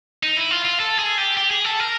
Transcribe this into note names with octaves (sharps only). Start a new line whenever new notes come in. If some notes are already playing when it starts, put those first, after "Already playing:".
D#4
E4
F4
F4
A4
G#4
G4
G4
G#4
A4
A#4